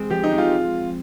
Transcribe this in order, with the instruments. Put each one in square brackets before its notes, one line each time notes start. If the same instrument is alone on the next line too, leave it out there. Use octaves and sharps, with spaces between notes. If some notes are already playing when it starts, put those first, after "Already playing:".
Already playing: [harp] G#3 C4
[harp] F3 [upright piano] G4
[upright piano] D#4
[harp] G#3 C4
[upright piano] F4